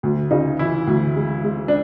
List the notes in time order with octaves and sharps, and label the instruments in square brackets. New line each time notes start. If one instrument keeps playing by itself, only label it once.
[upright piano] D2
[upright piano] C#3 [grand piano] D#4
[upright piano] E3 [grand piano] E4
[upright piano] D2
G#3
G#3
[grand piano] D4